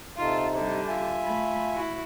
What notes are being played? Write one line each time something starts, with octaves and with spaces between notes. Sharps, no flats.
C3 D#4 F4 A4
D3 G3
F4 E5 G#5
A3 B5
E4 F#4